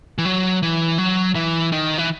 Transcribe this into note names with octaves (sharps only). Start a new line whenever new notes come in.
E3
F#3
E3
F#3
E3
D#3
E3